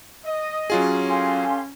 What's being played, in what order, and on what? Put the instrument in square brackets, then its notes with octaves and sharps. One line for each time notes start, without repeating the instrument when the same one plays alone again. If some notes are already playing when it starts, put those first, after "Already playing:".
[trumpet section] D#5
[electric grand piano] F#3 F4 G#4 [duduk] C#4
[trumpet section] G4 A4 [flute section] F5 G#5 C6